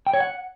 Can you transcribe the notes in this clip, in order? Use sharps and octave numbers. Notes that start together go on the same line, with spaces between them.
G5
C#5
F#5